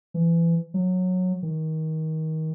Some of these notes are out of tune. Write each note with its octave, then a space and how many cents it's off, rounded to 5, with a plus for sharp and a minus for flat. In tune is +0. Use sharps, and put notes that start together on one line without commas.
E3 +25
F#3 -15
D#3 +25